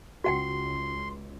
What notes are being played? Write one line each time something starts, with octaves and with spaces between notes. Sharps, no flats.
C#2 F#4 F#5 G5 C6